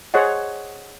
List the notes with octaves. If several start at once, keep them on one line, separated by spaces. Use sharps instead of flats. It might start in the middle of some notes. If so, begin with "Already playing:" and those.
G#4 C5 C#5 D#5 F#5